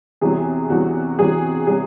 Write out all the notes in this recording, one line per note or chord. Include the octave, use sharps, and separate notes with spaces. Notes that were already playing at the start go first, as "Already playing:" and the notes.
E2 C3 F#3 G#4
E2 C3 F#3 F#4
E2 C3 F#3 G#4
C3 F#3 G#4